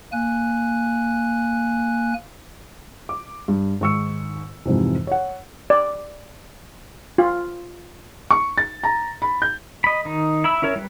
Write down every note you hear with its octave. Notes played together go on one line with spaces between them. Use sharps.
A#3 G#5 F#6
D6
G2
G#2 D#3 C#6 E6 C#7
F2 G#2 C3 E3
C#5 F#5
D5
F4
C#6
A6
A#5
B5
G6
D#5 B5
D#3 D#4
E4 B5 E6
C#4 E4 A#4 C#5
G3 B4